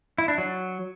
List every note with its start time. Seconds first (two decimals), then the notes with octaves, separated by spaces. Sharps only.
0.18 E4
0.28 D4
0.38 F#3